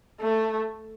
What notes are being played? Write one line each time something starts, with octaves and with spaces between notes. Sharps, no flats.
A3